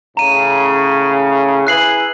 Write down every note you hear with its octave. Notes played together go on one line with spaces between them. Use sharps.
A2 C#3 A#5 D#7
E4 G#4 B4 F#6 C7 F#7